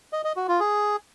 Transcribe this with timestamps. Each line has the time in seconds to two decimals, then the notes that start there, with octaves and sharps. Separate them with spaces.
0.13 D#5
0.25 D#5
0.36 F#4
0.48 F4
0.60 G#4